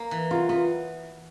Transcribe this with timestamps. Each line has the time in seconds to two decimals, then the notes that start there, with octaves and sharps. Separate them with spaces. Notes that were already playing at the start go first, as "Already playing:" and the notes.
Already playing: A#3
0.11 E3
0.31 F#3 F4
0.49 B3 F4